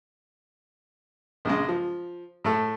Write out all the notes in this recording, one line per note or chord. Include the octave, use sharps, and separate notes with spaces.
A#1 C#3 G#3
F3
A2 A3 A4